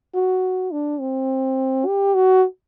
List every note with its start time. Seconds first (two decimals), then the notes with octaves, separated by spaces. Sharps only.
0.14 F#4
0.72 D4
1.00 C4
1.86 G4
2.15 F#4